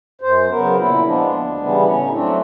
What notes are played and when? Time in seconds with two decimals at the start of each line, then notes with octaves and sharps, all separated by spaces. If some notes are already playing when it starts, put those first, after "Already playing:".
0.21 F#2 C5
0.49 C#3 F#3 B3 A#4
0.76 A#2 E4
1.03 F3 G#3 B3 D4
1.30 D2
1.57 C#3 E3 G3 B3
1.84 A2 C#4
2.03 D#4
2.11 F#3 A3 C4 D4